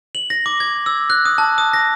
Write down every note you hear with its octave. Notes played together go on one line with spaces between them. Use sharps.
F#7
A#6
D6
G#6
E6
F#6
D#6
A5
D#6
A#6